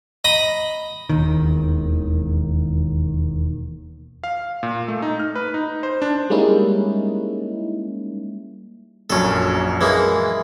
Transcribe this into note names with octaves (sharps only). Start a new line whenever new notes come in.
D#5 A#5 B5 D#6
E1 D#2 D#3
F5
A#2
A3
D#4
F6
B4
D#4
C5
D4
G3 G#3 A#3 C#4 D#4 E4
A#1 F#2 C#4 A4
E3 G#3 A#3